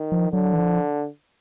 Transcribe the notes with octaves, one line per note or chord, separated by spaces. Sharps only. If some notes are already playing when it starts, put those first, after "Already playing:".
Already playing: D#3
F3
D3 F#3
E3
F3